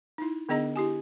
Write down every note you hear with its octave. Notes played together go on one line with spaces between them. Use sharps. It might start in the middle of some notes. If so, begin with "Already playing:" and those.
D#4 E4
D3 B3 D4 G#4 D#5 A#5
E4 G4 G#5